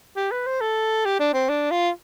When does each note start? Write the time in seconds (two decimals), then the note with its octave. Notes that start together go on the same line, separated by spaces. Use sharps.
0.16 G4
0.31 B4
0.46 C5
0.61 A4
1.05 G4
1.19 D4
1.34 C4
1.49 D4
1.71 F4